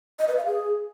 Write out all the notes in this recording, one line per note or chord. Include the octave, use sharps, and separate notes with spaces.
D#5
B4
F5
G#4